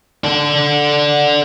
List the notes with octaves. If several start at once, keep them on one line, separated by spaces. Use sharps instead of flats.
D4 A4